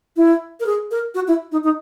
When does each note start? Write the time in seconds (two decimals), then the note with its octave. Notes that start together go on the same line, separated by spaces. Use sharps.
0.16 E4
0.60 A#4
0.66 G#4
0.91 A#4
1.15 F#4
1.28 E4
1.52 D#4
1.64 D#4